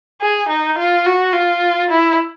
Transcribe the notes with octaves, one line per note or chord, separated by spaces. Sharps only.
G#4
D#4
F4
F#4
F4
E4